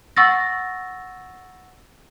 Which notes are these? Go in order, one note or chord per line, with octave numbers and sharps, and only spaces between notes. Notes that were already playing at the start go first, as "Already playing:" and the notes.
F#5 C#6 E6 A6 A#6